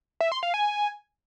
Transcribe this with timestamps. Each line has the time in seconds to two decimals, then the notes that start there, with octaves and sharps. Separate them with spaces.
0.21 E5
0.32 C6
0.43 F5
0.54 G#5